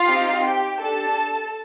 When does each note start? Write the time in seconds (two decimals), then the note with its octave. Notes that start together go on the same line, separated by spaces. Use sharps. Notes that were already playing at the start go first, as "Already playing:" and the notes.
Already playing: F4 F5
0.08 C4 D#4 G4
0.45 G4 G5
0.82 D4 G4 A4 A5